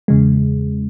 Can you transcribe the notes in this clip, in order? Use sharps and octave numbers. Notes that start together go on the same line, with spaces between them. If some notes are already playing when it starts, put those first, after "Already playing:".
E2 C#3 G#3